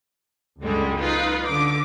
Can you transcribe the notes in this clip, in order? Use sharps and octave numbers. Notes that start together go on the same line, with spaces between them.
C#2 F#2 D3 G3 G#3
D#4 F4 B4
D3 D6